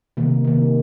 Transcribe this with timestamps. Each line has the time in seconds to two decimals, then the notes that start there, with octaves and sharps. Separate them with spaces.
0.17 C3 D#3 A#3
0.45 C3 D#3 A#3